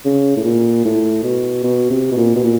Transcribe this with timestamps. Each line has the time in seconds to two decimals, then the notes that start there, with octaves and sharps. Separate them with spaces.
0.05 C#3
0.37 A2
0.44 A#2
0.85 A2
1.23 B2
1.63 B2
1.90 C3
2.12 B2
2.17 A#2
2.36 B2
2.44 A#2